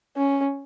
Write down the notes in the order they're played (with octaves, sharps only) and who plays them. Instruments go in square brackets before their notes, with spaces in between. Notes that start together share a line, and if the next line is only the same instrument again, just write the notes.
[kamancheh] C#4